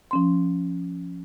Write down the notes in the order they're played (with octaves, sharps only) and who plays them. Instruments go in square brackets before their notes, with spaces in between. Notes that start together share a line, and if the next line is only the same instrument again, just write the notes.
[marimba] F3 C#4 C6